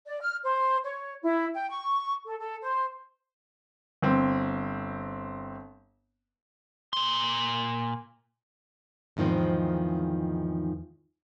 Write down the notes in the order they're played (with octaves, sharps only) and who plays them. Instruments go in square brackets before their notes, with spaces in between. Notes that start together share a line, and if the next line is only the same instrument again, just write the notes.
[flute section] D5
F6
C5
C#5
E4
G5
C#6
A4
A4
C5
[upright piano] G1 C4
[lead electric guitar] A#2 C6
[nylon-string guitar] E2 G#2 D#3 F3 C4